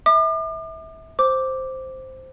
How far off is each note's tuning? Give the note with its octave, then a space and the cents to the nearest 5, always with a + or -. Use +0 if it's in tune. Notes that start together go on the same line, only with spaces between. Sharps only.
E5 -30 D6 +45
C5 +0 D6 +0